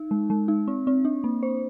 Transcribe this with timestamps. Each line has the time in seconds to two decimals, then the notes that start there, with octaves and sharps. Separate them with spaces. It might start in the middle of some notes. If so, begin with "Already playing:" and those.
Already playing: D#4
0.11 G#3
0.30 G#3
0.48 D#4
0.68 C4
0.87 C4
1.05 D4
1.24 A#3
1.43 C5